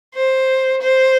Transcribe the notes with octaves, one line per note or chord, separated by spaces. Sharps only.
C5
C5